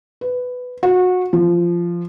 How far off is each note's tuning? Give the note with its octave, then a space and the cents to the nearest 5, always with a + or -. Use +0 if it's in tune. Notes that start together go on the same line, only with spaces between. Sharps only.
B4 +10
F#4 -25
F3 -15